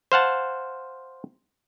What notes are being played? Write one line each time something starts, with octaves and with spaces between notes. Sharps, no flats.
C5 F5 F#5 A5